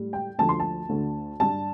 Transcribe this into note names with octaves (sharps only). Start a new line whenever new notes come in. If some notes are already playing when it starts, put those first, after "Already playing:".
Already playing: A2 G3
G5
D2 D3 F3 A3 A5
C6
A5
D2 D3 A3
G2 G3 A5